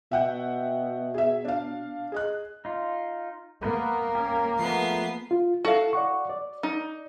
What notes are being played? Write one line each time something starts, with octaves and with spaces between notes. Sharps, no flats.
B2 E5 F#5 G5
G#4 E5
D4 F5
G#4 D#5 F#6
D#4 F4
A#3 B3 B4
C#4 G4
F3 A3 B3 G#4 C7
F4
E4 F#4 A4 F5
D5 F#5 C#6
D5
D#4